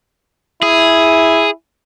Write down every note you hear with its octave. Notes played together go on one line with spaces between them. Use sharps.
E4 G#4